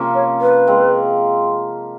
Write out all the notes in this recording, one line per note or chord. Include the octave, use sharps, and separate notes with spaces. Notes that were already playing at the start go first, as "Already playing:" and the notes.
Already playing: C3 F3 A#3 C#4
C#5
B4
G#3 C4 F4